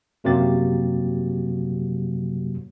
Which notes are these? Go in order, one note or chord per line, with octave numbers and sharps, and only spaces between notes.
F#2 C3 F#3 A#3 G4 A6